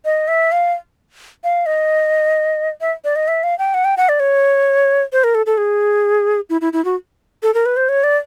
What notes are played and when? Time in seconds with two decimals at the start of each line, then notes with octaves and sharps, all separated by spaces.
0.05 D#5
0.28 E5
0.52 F5
1.44 F5
1.66 D#5
2.81 E5
3.05 D5
3.16 D#5
3.28 E5
3.43 F5
3.59 G5
3.74 F#5
3.85 G5
3.97 F#5
4.09 D5
4.20 C#5
5.12 C5
5.24 A#4
5.35 A4
5.46 A4
5.58 G#4
6.50 E4
6.61 E4
6.73 E4
6.85 F#4
7.43 A4
7.54 A#4
7.66 B4
7.77 C5
7.89 C#5
8.04 D5